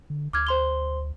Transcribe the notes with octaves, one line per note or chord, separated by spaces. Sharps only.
D3
D2 D6 F6 G#6
C5 C6 G7